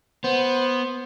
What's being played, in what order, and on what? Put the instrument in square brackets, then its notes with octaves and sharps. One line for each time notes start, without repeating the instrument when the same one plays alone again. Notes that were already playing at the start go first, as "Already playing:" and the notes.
[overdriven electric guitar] B3 [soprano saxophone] C5